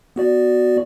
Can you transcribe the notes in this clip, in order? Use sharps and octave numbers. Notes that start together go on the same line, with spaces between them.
B3 F#4 D5